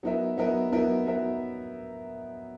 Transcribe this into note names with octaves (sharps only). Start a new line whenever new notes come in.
F#3 B3 D#4 A#4 E5
F#3 B3 D#4 A#4 E5
F#3 B3 D#4 A#4 E5
F#3 B3 D#4 A#4 E5